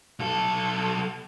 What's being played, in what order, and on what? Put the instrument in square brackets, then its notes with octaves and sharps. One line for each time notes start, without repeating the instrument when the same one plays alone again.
[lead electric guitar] B1 A4